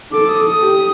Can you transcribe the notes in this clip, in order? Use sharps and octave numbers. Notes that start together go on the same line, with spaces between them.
A4 D6
D#6
D#6
G4